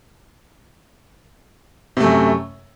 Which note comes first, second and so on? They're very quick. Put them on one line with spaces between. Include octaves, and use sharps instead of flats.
C3 A3 F#2